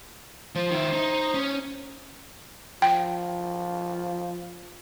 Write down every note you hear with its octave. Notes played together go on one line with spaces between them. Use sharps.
F3 C5
D#3 E4
D#4
C#4
F3 G5